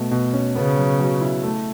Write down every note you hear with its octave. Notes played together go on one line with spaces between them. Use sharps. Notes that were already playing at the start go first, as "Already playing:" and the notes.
Already playing: B2 A3
B2
C#4
C#3 B3
F#3
F#3
E4
A3